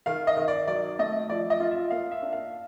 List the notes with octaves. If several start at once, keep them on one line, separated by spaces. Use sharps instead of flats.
D#3 F5
D#5
D#3
D5
F#3 D5
A3 D#5
F3 D5
D#5
F4
E5
A#3 F5
E5
D4
F5